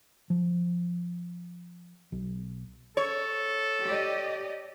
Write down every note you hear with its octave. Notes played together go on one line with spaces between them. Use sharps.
F3
B1
A4 C#5
G4 D5 D#5